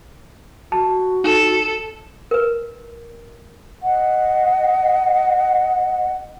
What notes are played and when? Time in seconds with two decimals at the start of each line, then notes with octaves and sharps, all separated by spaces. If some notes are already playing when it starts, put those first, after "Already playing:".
0.72 F#4 A5
1.24 D#4 A4 E7
2.31 A#4 B4
3.83 D#5 F#5